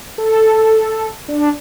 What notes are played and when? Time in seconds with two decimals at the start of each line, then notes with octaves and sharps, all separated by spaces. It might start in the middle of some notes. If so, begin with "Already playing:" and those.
0.18 A4
1.28 D4